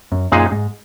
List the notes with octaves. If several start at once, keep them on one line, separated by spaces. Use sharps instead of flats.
F#2
F#2 A#2 G#3 D#4 G#4
G#2